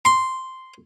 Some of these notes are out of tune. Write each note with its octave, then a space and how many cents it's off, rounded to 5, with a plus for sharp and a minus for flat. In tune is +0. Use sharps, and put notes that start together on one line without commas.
C6 -5